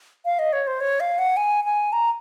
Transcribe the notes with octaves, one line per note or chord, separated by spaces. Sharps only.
F5
D#5
C#5
C5
C#5
F5
F#5
G#5
G#5
A#5